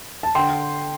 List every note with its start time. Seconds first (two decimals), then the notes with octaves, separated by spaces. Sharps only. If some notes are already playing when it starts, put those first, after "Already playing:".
0.23 A5
0.35 D3 G5 C6